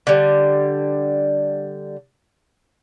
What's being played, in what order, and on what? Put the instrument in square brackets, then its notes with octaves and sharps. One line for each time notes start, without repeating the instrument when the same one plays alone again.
[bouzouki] D3 G3